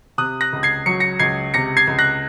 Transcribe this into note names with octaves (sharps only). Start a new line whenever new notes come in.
C3 D#6 F#6
F#6 A#6
C#2
G#6 C7
F#3 C#7
A#6 C#7
C#2 G#6 C7
C3 A#6 C#7
G#6 C7
C#2
F#6 A#6